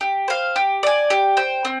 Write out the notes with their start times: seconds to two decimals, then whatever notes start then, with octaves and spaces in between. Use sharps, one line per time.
0.01 G4
0.28 C5 F5
0.56 G4
0.83 D5 G#5
1.10 G4
1.37 C5 G5
1.65 C4